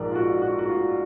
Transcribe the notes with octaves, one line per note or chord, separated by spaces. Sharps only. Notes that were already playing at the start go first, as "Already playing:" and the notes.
Already playing: A#1 G#2 F3 G#3 A#4 D5
F4
F#4
F#4
F#4
F4